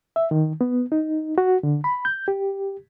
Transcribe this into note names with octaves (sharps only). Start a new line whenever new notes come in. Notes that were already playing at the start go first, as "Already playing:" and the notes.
E5
D#3
B3
D#4
F#4
D3
B5
G6
G4